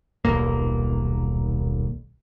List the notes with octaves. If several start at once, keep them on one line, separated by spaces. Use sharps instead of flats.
D#1 B1 A#3